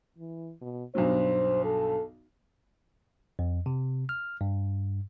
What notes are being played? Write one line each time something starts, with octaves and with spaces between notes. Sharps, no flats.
E3
B2
B1 G2 F#3 C5
A4
F2
C3
F6
G2